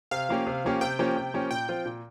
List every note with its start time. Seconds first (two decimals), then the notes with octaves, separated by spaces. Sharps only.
0.11 C3 F5
0.29 F3 A#3 C#4 G4
0.47 C3
0.64 F3 A#3 C#4 G4
0.81 C3 G5
0.99 F3 A#3 C#4 G4
1.16 C3
1.34 F3 A#3 C#4 G4
1.51 A#2 G5
1.69 F3 C4 F4
1.86 A#2